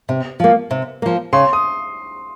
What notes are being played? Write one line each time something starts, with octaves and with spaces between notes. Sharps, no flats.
C3
F3 A#3
C3
F3 A#3
C#3 C6
D#6